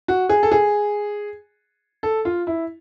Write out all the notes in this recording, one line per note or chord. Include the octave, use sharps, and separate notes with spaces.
F#4
G#4
A4
G#4
A4
F4
E4